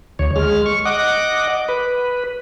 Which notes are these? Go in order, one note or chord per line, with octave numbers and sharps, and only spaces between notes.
D2 C#5
G#3 F6
C#6
D#5 F#5 D6
B4